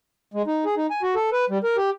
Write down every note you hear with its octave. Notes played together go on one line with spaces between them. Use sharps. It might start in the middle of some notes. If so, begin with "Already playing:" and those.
G#3
D#4
G#4
D#4
G#5
F#4
A4
B4
G3
A#4
G4